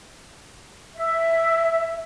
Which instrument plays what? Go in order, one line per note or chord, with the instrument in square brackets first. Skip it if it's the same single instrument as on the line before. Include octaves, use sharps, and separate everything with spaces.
[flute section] E5